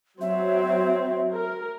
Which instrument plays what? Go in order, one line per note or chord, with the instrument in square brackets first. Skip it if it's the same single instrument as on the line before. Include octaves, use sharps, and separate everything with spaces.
[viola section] F#3 C4 [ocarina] E5
[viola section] A#4